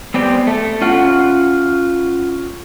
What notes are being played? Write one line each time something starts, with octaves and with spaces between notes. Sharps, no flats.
B3 C4 G4 D5
A3
C#4 F4 F#5